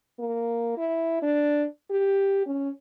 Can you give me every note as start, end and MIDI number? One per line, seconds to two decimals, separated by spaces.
0.19 0.72 58
0.77 1.17 64
1.22 1.65 62
1.90 2.42 67
2.47 2.69 61